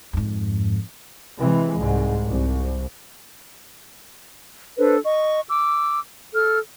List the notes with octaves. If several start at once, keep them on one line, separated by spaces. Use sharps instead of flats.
F2 G#2
C3 E3 G#3
C2 G#2
C2
D4 A4 B4 C5
D#5 C#6
D6 E6
A4 F6